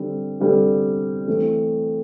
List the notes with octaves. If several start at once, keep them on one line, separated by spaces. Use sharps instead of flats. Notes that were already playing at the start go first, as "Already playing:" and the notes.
Already playing: D3 G3 C4 G4
D3 G3 C4 G4
E3 A3 C4